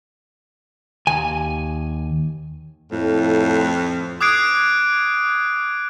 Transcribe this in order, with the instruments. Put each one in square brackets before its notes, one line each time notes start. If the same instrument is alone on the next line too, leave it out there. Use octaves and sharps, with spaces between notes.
[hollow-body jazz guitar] D#2 G#5
[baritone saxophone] F2 [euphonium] A2
[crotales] D6 D#6 F#6 G#6 C7 D7